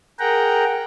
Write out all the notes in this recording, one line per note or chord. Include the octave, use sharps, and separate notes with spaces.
G#4 A#4 F#5 G5 A#5